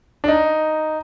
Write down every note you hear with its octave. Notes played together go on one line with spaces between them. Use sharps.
D4
D#4